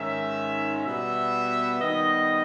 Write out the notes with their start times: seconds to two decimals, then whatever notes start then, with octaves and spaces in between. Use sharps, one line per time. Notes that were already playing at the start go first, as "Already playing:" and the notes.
Already playing: G#2 D#3 G#3 C#4 E5
0.85 B2 G3 B3 E5
1.81 D#3 G3 B3 D#5